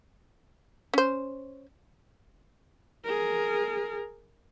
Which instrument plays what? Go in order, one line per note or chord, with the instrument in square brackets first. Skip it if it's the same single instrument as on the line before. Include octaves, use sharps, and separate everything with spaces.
[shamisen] C#4 C5
[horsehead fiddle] G#4 A#4